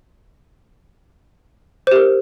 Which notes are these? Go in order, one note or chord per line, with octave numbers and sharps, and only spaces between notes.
G4 A#4 C5